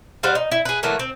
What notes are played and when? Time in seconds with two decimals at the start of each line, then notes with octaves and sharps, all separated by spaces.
0.23 G3 F#4 C5 F5
0.35 D#4
0.52 E4
0.65 G#4 B4
0.83 E3 F#3 A3 A#3
0.99 C4